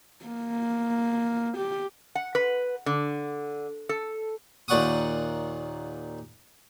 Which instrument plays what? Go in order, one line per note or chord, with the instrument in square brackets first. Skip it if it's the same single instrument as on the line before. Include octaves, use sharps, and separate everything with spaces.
[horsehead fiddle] A#3
G4
[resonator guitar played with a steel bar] F#5
B4
D3
A4
[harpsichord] D#2 A#2 D5 F#5 C#6 D#6